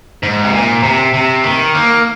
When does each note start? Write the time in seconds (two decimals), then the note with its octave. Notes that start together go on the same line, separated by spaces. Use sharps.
0.23 G#2
0.44 C3
0.53 A#2
0.83 C3
1.14 C3
1.44 D#3
1.75 A#3